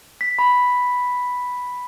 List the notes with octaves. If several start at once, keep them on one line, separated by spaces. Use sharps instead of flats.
B6
B5